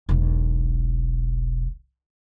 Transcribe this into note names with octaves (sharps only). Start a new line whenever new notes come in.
E1 B1